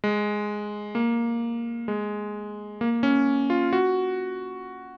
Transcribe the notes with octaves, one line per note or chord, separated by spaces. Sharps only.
G#3
A#3
G#3
A#3
C#4
F4
F#4